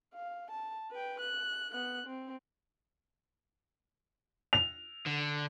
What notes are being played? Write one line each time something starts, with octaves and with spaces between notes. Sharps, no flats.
F5
A5
B4 G5
F#6
B3 F#6
C4
F7
D3